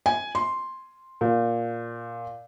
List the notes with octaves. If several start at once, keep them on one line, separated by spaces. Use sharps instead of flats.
G#5
C6
A#2